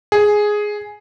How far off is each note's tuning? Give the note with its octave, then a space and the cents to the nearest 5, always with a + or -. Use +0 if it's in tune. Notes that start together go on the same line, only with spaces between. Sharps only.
G#4 +5